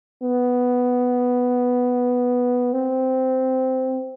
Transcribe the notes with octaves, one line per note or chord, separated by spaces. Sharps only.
B3
C4